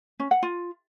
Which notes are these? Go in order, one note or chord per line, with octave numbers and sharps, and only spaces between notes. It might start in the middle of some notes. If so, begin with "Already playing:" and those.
C#4
F#5
F4